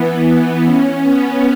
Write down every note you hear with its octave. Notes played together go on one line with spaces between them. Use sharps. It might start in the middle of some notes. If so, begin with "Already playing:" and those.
Already playing: E3 B3
C#4
B3